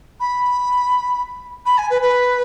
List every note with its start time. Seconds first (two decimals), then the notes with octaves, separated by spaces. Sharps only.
0.19 B5
1.65 B5
1.77 G#5
1.90 B4
2.01 B4